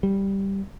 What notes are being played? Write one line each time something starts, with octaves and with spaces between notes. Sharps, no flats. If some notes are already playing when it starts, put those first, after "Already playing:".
G3